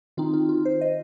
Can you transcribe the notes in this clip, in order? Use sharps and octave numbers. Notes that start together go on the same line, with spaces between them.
D#3 C4 D#4 F4
F4
F4
C5
D#5